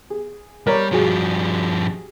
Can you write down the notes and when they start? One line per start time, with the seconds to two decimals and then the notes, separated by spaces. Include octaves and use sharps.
0.10 G#4
0.67 G3 A#4 C#5 D5
0.92 G2 F3 G3 F#4 G#4